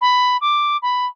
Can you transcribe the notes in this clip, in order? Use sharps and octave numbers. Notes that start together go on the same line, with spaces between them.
B5
D6
B5